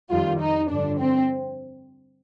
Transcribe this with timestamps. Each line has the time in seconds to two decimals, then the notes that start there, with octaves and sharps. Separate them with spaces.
0.11 F2 D#3 G3 F4
0.41 D#4
0.70 G2 D3 F3 D4
0.99 C4